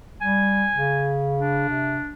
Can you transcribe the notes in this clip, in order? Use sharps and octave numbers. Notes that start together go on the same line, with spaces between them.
G3 G#5
C#3
D4
C3